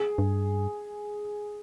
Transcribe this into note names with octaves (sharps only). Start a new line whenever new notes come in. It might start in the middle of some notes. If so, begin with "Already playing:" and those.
Already playing: G#4
G2